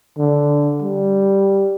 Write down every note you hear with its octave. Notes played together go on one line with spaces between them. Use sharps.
D3
G3